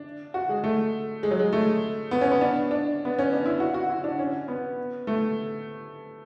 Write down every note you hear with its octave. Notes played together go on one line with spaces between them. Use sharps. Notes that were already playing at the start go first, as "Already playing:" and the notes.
Already playing: D4
F#4
G#3
A3
G#3
F#3
G#3
A3
B3
C#4
B3
D4
D4
B3
C#4
D4
E4
F#4
F#4
E4
D4
C#4
B3
A3